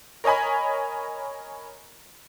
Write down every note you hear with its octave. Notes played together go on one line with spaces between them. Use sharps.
A#4 C#5 D#5 G#5 B5